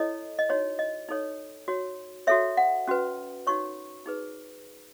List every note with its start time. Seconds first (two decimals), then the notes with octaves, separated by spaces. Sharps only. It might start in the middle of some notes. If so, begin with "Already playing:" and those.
Already playing: E4 A4 C#5 D#5
0.39 D#5
0.49 D#4 F#4 C#5
0.79 D#5
1.09 D#4 A4 C#5
1.68 F#4 C#5
2.27 F#4 A4 C#5 E5
2.57 F#5
2.88 C#4 F#4 B4
3.47 D#4 F#4 C#5 C#6
4.06 D#4 G#4 B4